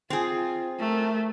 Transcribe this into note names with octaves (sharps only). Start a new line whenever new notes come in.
C4 F4 G#4
A3 A#4